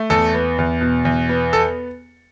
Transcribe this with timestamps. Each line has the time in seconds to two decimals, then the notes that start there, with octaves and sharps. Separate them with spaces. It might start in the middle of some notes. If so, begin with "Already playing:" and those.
Already playing: A3
0.10 E2 A4
0.34 B3
0.58 E2
0.81 B2
1.05 E2
1.29 B3
1.53 A4